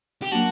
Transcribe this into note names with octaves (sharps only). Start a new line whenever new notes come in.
G4
F#3 A#3 D4 F#4